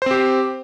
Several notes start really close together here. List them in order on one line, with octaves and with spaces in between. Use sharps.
C5 C4 G4